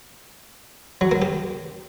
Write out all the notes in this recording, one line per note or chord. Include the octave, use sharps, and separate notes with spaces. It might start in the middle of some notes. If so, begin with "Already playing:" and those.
F#3
A#3
G4